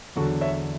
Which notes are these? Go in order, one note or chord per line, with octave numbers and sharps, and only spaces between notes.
E2 D3 F#3 F#4 A4
C#5 E5